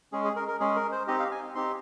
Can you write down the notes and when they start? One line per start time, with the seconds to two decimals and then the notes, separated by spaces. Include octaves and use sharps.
0.12 G#3 C#4 G#4
0.24 G#4
0.36 A#4
0.48 A#4
0.60 G#3 C#4 G#4
0.76 A#4
0.92 C5
1.07 C4 D#4 G4 D#5
1.20 F5
1.32 G#5
1.55 C4 D#4 G4 C6